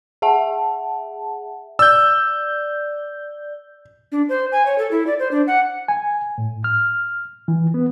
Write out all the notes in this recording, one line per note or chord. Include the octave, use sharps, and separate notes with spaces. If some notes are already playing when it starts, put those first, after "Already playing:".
G#4 E5 F#5 A5
D5 E6 G6
D4
C5
G#5
C#5
A4
E4
D5
C5
D4
F#5
G#5
A2
F6
E3
B3